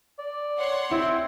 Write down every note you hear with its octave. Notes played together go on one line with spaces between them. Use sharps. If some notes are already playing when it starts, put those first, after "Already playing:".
D5
C#5 F#5 C6
C4 E4